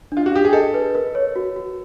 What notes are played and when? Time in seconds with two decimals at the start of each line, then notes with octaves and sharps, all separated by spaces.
0.12 D4 F4
0.26 F#4
0.33 D4 G4
0.45 G#4
0.53 A4 D#5
0.74 B4
0.95 A#4
1.15 C#5
1.36 F#4
1.56 F#4